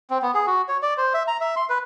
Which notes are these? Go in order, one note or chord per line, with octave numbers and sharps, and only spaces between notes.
C4
B3
G#4
F#4
C#5
D5
C5
E5
A#5
E5
C6
B4